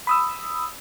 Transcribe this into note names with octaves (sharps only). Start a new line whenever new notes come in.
B5 D#6 E6